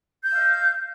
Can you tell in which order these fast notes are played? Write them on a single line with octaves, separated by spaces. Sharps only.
G6 E6 F5 D#5